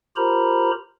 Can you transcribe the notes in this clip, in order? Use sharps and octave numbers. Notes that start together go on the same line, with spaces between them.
F4 G4 A#4 C5 A#5 B5